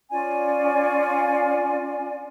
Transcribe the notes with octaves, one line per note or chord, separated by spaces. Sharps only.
C#4 F4 D5 G#5